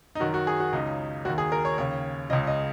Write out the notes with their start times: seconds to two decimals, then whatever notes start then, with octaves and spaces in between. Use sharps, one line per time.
0.15 D#4
0.20 F#2 D#3 F#4
0.34 F#4
0.47 G#4
0.60 F#4
0.73 C#2 C#3 D#4
1.25 D#2 F#4
1.30 D#3
1.38 G#4
1.52 A#4
1.65 C#5
1.78 D#2 C#3 C#5
2.30 C#2 C#3 D#5
2.47 D#5